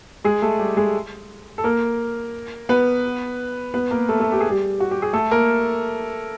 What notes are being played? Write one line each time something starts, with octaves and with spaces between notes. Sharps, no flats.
G#3 G#4
A3 A4
G3 G4
G#3 G#4
A4
A#3 A#4
B3 B4
B3 B4
A#3 A#4
A3 A4
A3 A4
G4
G#4
G3 G4
F#4
G4
G#4
A3 A4
A#3 A#4